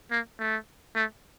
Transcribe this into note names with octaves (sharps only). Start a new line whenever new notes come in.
A#3
A3
A3